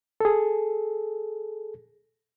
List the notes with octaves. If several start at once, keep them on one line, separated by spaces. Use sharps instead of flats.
G#4 A4